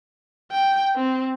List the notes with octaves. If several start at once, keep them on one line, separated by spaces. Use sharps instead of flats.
G5
C4